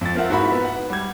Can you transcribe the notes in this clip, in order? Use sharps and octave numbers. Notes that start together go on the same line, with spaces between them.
F2 A6
C4 F4 A#4 E5 F#5
G#2 E4 F#4 E5 B5
B3
F#5
G3 G#6